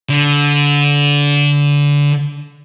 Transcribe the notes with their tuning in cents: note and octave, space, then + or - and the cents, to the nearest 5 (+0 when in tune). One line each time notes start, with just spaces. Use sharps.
D3 -25